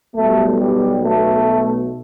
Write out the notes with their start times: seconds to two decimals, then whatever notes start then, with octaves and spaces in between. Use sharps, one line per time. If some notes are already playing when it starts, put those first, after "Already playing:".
0.16 B1 B2 G3 A3
0.59 G3
1.03 A3